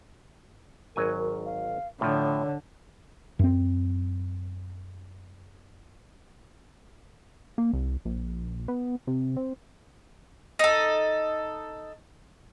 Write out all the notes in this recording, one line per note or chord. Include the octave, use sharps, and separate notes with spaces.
G#1 F#3 A#4 G#5
F5
A2 D3 F3 C#5
F#2 C4
A#3
C2
A#1
B3
C3
C4
D#4 A4